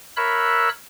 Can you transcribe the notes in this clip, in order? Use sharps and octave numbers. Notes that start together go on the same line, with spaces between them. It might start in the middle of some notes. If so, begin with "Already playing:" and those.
A#4 C#5 E5 B5 E6 F#6